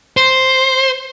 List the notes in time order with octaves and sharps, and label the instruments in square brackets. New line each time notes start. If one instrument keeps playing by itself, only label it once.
[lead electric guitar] C5